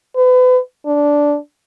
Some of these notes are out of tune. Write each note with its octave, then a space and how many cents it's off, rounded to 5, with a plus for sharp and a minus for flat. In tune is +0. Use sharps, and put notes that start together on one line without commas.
B4 +35
D4 -10